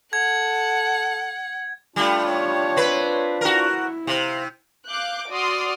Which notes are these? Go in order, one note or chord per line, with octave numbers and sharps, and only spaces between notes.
A4 F#5 G#6
G3 A3 D4 F4
C#5
C4 B4
E4 F#4 A#4
C3 C5 F5
F5 D6 F#6 G6
F#4 D5 C6 D6 D#6 F6